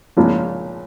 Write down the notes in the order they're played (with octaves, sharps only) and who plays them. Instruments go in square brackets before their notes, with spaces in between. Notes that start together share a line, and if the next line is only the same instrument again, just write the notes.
[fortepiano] A#1 A#2 G#3 C#4 F4